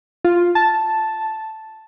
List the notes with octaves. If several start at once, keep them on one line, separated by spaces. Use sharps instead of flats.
F4
A5